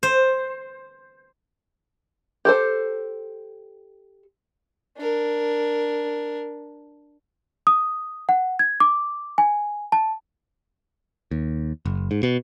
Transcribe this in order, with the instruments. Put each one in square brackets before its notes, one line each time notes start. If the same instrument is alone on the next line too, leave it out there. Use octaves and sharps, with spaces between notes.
[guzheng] C5
[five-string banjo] G4 A4 C5
[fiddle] D4 A#4
[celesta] D#6
F#5
G#6
D6
G#5
A5
[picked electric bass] D#2
F#1
G#2
B2